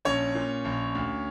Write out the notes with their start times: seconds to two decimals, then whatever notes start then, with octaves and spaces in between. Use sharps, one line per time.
0.05 A#1 C#4 C#5
0.35 A#2
0.65 A#1
0.95 D2